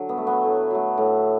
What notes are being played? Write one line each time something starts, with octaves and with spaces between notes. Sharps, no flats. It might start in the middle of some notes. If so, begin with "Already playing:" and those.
Already playing: D3 F#3
B3
A3
B3
A2
F#3 A3
A2